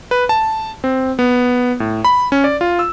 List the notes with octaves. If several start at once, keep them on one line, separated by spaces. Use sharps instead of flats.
B4
A5
C4
B3
A2
B5
C#4
D5
F4
E6